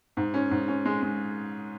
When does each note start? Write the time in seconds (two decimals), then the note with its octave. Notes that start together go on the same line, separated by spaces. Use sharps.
0.17 G#2
0.34 C#4
0.51 G#2
0.68 C#4
0.85 G#3
1.02 G#3